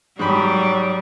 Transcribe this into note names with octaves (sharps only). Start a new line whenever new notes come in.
G#2 F#3 G3 B5